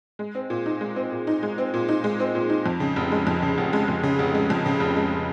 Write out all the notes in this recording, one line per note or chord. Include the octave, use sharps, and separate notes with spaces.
G#3
C4
A#2
D#4
G#3
C4
A#2
D#4
G#3
C4
A#2
D#4
G#3
C4
A#2
D#4
F2
C#3
F1
G#3
F2
C#3
F1
G#3
F2
C#3
F1
G#3
F2
C#3
F1
G#3